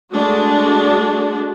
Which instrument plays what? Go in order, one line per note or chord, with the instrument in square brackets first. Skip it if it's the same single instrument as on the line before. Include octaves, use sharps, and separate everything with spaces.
[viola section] G#3 A3 D4 F#4